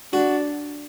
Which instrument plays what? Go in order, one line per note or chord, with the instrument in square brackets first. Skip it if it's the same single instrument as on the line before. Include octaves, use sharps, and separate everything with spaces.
[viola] D4 [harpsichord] F#4